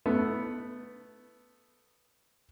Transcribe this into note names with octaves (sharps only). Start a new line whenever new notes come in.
A3 B3